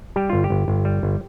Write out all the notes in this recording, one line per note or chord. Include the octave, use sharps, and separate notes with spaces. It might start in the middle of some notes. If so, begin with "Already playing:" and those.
G3 G4
G1 F4
G4
G1
G1
G3
G1